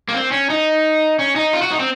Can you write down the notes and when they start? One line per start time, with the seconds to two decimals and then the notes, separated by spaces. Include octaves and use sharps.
0.08 A#3
0.14 C4
0.32 C#4
0.50 D#4
1.19 C#4
1.36 D#4
1.53 F4
1.62 F#4
1.72 D#4
1.80 C4